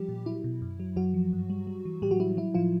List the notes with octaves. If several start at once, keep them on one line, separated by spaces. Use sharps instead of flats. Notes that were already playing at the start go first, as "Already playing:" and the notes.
Already playing: F3 G3 G4
A#2
F#3 E4
B2
F#2
F#3
F#2 F#3 F#4
F3
G2
G3
G3
E3
A2 G3 G4
F#3 F#4
G3 E4
F#3 E4
A2 F3 F4